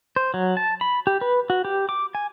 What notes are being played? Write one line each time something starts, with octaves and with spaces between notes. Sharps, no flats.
C5
F#3
A5
B5
G4
B4
F#4
G4
D6
G#5